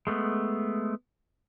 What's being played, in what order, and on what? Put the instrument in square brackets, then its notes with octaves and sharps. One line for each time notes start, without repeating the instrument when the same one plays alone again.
[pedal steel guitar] G#3 A3 B3